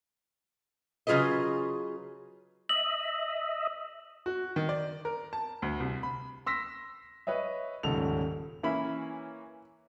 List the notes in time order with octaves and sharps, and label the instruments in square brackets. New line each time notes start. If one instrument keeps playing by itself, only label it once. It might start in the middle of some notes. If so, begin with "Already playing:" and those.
[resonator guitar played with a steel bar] C#3 F#3 F4 G#4 B4 D#5
[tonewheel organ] D#5 E5 [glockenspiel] F#7
[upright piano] F#4
D#3
D5
A#4
A5
D2
C2
B5
[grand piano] C6 E6 A#6 B6
B4 C#5 D#5 E5
D#1 G#2 C#3 A4 F7
[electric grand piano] E3 A#3 C#4 [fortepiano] E4 B5